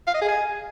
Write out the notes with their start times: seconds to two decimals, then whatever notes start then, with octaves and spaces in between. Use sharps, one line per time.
0.07 F5
0.14 D#5
0.22 G#4
0.29 G#5